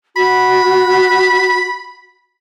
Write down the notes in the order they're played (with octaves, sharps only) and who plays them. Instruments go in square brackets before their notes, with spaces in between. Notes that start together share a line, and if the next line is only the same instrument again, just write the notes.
[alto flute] F#4 [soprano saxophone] B5